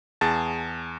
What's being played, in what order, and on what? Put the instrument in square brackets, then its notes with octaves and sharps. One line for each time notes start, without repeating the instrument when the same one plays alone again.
[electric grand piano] E2 G#4 A5 A6